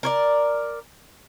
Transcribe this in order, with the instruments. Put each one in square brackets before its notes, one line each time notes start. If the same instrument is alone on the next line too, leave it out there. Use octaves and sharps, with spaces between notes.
[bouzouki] A#4 C#5 D5